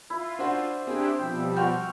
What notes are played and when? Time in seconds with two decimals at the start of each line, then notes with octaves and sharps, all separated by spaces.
0.10 E4 F4
0.39 D4 F#4 C5
0.87 C4 D4 E4 G4 G#4
1.19 B2 F3 G3 E5 G5
1.56 F#4 G5 C6 C#6 F6